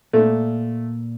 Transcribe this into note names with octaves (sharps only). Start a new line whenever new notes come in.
A#2 A3